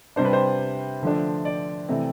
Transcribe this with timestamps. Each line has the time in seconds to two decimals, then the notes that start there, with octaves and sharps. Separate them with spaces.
0.16 C3 G3 D4 C5
0.25 B4
0.33 C5
1.02 D3 F3 A3 D4
1.45 D5
1.89 C3 E3 A3 C4